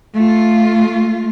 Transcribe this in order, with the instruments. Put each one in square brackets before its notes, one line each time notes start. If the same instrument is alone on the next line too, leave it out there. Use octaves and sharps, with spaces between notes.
[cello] A3 F4